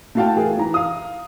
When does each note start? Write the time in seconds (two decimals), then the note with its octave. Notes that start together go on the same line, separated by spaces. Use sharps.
0.15 A3 E4 F#4 F5 G5 A5
0.36 E3 G#4 A#4
0.57 E3 A#5
0.74 F5 D#6